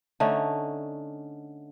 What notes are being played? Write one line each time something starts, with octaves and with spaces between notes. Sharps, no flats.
D3 A3 C#4 D#4